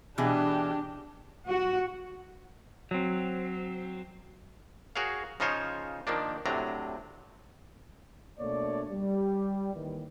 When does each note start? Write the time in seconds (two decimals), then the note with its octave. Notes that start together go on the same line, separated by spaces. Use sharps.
0.18 B2 E3 D4 G4 G#4
1.47 F#4
2.91 F#3 C4
4.96 F#4 G#4 A#4 C#5 F5
5.40 C#3 F3 D#4 F4 C5 C#5
6.07 D#3 F3 A#3 D4
6.46 A2 C3 F#3 D4 A#5
8.39 B2 A3 A#3 D4 C#5 D5
8.91 G3
9.74 D#2 D#3 E3